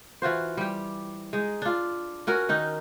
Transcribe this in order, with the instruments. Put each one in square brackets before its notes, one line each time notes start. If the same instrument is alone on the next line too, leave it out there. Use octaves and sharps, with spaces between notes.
[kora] E3 F4 F#4 C5
G3 G4
G#3 D#4
D4 F4
C#4 F#4 A#4
D#3 D#4